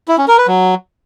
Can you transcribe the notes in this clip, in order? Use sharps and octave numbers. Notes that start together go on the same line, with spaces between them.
E4
C#4
A#4
B4
F#3